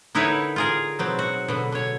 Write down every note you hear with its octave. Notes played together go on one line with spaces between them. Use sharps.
D3 D#4 E4 A#4 B4 C#5
F4 G#4 A#4
B2 F#3 C4
F#4
B2 D3
D3 C#5